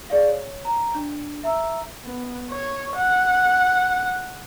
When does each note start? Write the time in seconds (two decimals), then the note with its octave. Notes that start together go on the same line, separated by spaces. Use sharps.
0.10 G#4 D5 F5
0.28 C#5
0.65 A#5
0.95 D4
1.43 E5 A#5 E6
2.05 B3
2.52 C#5
2.96 F#5